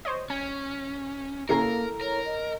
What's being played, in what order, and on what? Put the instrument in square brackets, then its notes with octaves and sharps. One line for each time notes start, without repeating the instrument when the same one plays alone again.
[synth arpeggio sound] C5 C#5 D#5
[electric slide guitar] C#4 [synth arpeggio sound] G#5
[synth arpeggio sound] C#3 C#4 C7 [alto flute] A#3 [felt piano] E4 A4 A#5 [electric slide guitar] A#4
[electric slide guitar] A#4 [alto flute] C#5
[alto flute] D#5